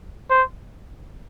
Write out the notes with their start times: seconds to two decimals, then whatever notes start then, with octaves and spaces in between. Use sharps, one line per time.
0.30 C5